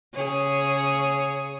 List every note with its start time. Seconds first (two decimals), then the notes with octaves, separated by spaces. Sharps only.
0.14 C#3 G#4 C#5